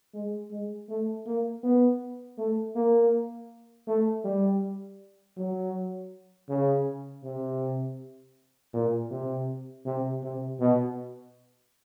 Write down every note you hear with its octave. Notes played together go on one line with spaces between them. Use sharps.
G#3
G#3
A3
A#3
B3
A3
A#3
A3
G3
F#3
C#3
C3
A#2
C3
C3
C3
B2